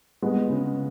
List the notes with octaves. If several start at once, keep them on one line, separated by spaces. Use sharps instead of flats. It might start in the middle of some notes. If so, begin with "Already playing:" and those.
G#3 B3
C#3